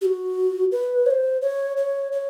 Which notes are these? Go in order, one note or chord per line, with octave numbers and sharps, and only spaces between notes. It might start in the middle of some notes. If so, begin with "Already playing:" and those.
G4
F#4
B4
C#5
C5
C#5
C#5
C#5